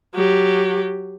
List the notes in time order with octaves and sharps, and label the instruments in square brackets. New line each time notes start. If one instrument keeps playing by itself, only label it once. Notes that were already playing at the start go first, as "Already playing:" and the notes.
[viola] F#3 G4